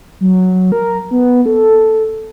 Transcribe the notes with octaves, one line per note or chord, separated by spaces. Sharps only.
F#3
A#4
B3
A4